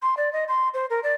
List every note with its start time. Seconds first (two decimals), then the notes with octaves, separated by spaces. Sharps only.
0.02 C6
0.17 D5
0.32 D#5
0.48 C6
0.73 C5
0.90 A#4
1.03 D5